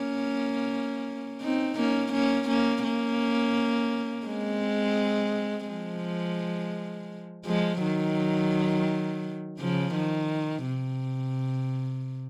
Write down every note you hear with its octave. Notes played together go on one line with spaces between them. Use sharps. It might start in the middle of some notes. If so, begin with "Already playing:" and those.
Already playing: A#3 C#4
C4 D#4
A#3 C#4
A#3 C#4
A#3 C#4
A#3 C#4
G#3 C4
F3 G#3
F3 G#3
D#3 F#3
C#3 F3
D#3
C3